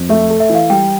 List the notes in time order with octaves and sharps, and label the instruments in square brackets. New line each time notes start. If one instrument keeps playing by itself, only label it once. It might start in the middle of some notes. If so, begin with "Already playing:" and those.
Already playing: [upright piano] F2
[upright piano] A3 [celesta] E5
[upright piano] A4
[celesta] E5
[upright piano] E3
[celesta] F5
[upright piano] G3 [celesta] G5